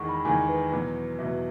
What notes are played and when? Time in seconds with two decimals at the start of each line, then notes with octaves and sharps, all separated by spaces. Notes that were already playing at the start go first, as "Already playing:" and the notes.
Already playing: E2 D#3 G#3 F#5 C#6
0.09 B5
0.25 E2 D#3 G#3 G#5
0.48 B4
0.72 E2 B2 F#3 B3 B4
1.19 E2 B2 F#3 B3 E5